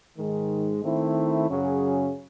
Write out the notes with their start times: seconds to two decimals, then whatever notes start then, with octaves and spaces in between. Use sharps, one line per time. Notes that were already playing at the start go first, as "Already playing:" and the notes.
0.18 G#2 D#3 G#3
0.82 D#3 A3 C4 E4
1.47 F#2 C#3 F#3 C#4 G#4